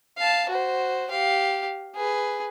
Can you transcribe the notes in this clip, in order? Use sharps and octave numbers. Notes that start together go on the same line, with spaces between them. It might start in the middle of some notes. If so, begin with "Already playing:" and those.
F5 A5
F#4 C5
G4 F5
G#4 B4